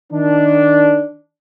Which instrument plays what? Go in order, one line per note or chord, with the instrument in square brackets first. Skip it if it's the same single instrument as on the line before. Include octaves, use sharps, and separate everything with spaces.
[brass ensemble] D#3 D4